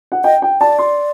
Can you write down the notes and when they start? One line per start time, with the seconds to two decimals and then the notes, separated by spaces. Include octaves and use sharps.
0.12 F#5
0.24 D#5 G5
0.42 G5
0.61 D5 A5
0.79 C6